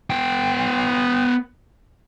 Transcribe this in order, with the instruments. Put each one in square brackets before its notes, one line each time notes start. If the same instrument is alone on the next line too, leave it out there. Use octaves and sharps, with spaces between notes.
[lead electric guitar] B3 G5